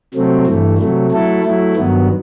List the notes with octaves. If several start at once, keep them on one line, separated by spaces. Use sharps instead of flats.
C3 F#3 A3 C4
G2 E3 A3
C3 F#3 A3
F#3 A3 E4 A4
F#3 A3 E4
G2 D#3 F#3 B3